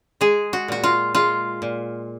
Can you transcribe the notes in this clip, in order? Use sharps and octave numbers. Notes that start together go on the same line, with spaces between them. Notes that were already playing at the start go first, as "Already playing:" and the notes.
G#3 G#4
F#4
A#2 F#4
F4
G#3 F4
A#2